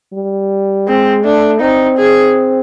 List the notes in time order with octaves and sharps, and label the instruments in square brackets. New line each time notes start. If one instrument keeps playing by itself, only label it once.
[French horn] G3
[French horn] G#3 [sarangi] C4
[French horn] A3 [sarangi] D4
[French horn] C4 [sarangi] D#4
[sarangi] G#4